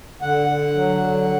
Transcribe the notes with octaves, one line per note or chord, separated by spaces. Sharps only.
D3 F#5
D3
F#3
D3